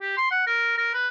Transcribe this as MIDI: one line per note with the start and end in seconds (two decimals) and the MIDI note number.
0.02 0.15 67
0.17 0.28 84
0.31 0.44 78
0.47 0.77 70
0.77 0.92 70
0.94 1.08 71